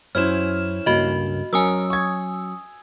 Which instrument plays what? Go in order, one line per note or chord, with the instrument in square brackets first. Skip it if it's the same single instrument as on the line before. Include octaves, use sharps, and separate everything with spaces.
[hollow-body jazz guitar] F#2 [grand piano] C#4 E4 C5 [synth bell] F6 E7
[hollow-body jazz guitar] C#2 G2 A#3 [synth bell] F#4 D#5
[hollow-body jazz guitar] F#3 C#4 [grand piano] A#4 [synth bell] G#5 D#6 E6
[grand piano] C#6 G#6